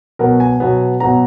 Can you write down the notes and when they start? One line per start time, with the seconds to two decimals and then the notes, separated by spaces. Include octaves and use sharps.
0.19 B2 F#3 B3 A#4
0.40 G#5
0.60 B2 F#3 B3
1.00 B2 F#3 B3 A#5